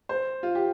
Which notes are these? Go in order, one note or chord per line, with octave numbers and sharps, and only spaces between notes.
C5
F4
G4